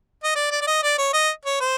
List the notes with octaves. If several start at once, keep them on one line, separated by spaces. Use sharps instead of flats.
D#5
D5
D5
D5
D#5
D5
C#5
D#5
C#5
C5